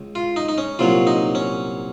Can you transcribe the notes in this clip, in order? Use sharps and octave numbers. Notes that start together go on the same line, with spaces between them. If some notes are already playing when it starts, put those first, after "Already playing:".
Already playing: C#2
F4
D#4
D#4
C#4
C2 A#2 F#3 A#3 F4
D#4
C#4